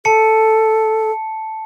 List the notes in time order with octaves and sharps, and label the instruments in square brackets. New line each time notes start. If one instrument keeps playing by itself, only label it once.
[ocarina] A4 [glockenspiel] A5 C#7